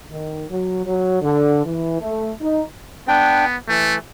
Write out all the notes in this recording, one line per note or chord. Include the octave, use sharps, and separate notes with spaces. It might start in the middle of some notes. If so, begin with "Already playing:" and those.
D#3
F#3
F#3
D3
E3
A3
D#4
B3 D4 G5
E3 A3